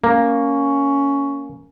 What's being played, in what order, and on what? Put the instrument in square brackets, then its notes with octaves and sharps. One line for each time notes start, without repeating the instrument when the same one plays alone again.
[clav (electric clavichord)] A#3 [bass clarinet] C#4